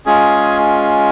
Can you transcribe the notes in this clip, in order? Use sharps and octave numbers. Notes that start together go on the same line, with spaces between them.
G#3 C#4 F4 G#4